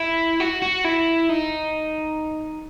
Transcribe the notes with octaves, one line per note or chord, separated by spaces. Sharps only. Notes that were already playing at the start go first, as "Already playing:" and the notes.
Already playing: E4
F#4
F#4
E4
D#4